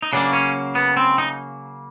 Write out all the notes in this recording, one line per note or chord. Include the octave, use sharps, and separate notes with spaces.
D#4
C#3 F#3 A#3 D4
C#4
B3
C4
D#4